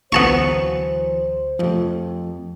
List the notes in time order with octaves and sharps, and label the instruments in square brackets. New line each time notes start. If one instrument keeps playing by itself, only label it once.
[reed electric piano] D2 [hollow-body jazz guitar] E3 F#3 [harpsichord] B3 A5 C#6 [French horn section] C5
[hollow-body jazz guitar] F2 [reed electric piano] F3 A3